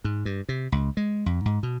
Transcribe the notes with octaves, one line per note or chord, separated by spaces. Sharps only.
G#2
G2
C3
C#2
G#3
F2
G#2
B2